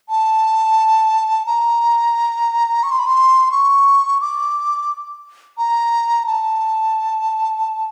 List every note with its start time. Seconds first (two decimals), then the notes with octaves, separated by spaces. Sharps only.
0.09 A5
1.46 A#5
2.83 C#6
2.91 C6
2.99 B5
3.06 C6
3.52 C#6
4.21 D6
5.58 A#5
6.27 A5